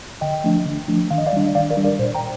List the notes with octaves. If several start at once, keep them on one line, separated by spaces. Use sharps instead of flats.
D3 D#5 G5
F3 A3 D4
D3
F3 A3 D4
D#3 F5
D#5
D5 F5
G3 D4
D#3 D5 F5
A#4 D5
G3 D4
A#4 D5
A#2 C5
G5 A#5